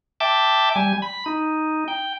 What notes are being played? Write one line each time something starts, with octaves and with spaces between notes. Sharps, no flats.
E5 G5 A5 D6
G3 G#5
B5
D#4
G5